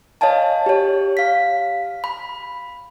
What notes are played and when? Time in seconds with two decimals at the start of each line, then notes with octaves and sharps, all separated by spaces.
0.21 C#5 D#5 F5 G#5 A5
0.66 G4 C#5
1.17 F5 B6
2.04 B5